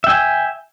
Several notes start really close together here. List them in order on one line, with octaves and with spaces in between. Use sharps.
E5 G5 G#5